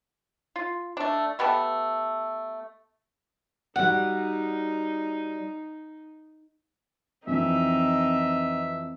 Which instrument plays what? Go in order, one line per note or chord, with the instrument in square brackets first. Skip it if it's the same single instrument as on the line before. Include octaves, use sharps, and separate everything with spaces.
[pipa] F4
A3 D4
A3 B3 G4 A4
[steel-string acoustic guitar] G3 F#4 D5 [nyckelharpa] D#4 [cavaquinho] F#5
[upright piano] F2 E3 [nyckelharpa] C4 D#4 [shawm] E5